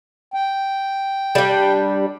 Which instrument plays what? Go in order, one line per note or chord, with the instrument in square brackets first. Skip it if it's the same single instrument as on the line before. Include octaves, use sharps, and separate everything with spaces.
[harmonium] G5
[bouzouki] G3 D4